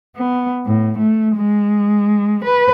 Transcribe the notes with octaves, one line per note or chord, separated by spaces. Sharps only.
B3
A2
A3
G#3
B4